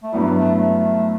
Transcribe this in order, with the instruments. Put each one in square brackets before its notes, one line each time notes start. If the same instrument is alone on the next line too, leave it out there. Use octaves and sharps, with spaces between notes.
[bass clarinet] A3
[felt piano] G2 F#3 B3 E4 [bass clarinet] G3
[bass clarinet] A3
A3